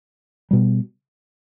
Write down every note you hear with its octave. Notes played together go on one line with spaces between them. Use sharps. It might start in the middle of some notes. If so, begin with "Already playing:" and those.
B2 G3